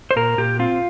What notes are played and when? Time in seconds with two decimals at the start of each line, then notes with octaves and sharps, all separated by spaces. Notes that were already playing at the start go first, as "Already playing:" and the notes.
0.11 C5
0.16 A#2 A#4
0.38 A#2 G4
0.59 C4 F4